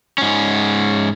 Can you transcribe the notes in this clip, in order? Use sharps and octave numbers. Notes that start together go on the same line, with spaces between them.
G#2 C#4